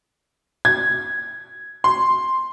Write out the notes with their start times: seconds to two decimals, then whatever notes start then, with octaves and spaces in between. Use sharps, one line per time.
0.65 G#6
1.84 C6